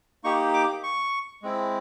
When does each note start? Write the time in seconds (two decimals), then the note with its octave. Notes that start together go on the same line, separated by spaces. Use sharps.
0.24 A#3 D#4 G4 C#6
0.54 D6
0.84 C#6
1.43 G#3 C4 E4